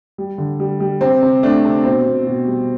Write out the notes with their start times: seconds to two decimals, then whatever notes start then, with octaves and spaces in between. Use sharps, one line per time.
0.18 G3
0.38 D3
0.60 G3
0.80 G3
1.01 C3 C4
1.22 C3
1.43 A3 D4
1.65 C3
1.85 B2 C4
2.07 B2
2.27 B2
2.47 G3